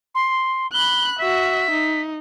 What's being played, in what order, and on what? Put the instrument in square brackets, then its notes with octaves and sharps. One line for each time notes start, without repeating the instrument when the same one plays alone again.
[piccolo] C6
[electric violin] B5 F#6 [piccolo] G7
[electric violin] F#4 E5 [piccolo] B6
[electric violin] D#4